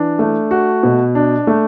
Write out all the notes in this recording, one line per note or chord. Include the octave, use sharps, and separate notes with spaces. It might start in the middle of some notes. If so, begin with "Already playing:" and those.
Already playing: E3 D4
A3
F#4
B2
D4
A3